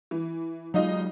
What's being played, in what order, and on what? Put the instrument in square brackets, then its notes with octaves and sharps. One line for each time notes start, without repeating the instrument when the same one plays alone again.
[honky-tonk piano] E3
[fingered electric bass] F#3 G#3 [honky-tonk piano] D#4 F4 D#5